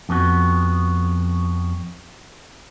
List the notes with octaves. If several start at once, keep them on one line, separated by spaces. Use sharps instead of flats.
F2 B3 F#4